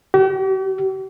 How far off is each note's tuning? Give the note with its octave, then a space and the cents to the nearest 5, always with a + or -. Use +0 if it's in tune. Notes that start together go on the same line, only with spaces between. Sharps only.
G4 -45